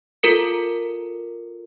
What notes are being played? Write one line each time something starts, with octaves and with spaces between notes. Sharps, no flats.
F4 A4 A#4 C#7